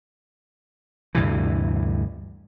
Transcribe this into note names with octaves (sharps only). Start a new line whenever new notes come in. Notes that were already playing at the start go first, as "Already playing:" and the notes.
D2 G2 C3 E3